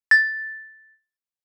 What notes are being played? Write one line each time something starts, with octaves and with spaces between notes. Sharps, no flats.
A6